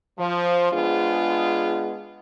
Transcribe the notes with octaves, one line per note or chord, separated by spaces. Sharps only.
F3
G#3 B3 D4 F4 G#4